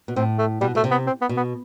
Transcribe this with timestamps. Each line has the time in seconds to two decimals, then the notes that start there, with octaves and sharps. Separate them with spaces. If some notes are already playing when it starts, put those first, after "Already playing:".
0.08 B2
0.16 A2 C4
0.39 A3
0.61 B2 G3
0.75 B2 A3
0.84 C3
0.91 B3
1.07 C4
1.22 B3
1.29 B2
1.37 B3